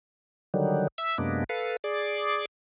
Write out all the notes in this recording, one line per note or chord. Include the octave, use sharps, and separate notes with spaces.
D3 D#3 F#3 G3
E5 E6
F#2 C3 G#3 A#3 B3 D4
A4 B4 F5
G#4 D5 D6